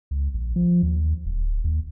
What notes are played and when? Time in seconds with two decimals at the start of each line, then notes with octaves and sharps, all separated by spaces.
0.11 C#2
0.34 A#1
0.56 F3
0.83 D#2
1.25 D1
1.64 D#2